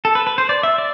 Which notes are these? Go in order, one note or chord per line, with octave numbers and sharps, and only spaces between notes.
A4
B4
B4
C5
D5
E5
D5